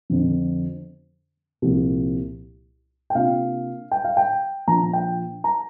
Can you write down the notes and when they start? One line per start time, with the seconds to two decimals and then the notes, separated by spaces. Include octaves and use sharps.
0.10 F2 D3 F3
1.62 C2 A#2 F3
3.10 G5
3.15 C3 A#3 D4 F4 F5
3.91 G5
4.04 F5
4.17 G5
4.67 A#2 F3 D4 F4 A#5
4.93 G5
5.44 A#5